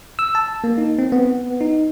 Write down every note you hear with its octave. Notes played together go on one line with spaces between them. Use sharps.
E6
A5
A#3
D#4
C4
B3
D#4